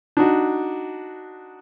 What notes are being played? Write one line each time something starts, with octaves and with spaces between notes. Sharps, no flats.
D4 D#4 F#4